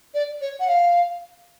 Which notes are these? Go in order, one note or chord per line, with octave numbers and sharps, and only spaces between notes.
D5
C#5
F#5
F5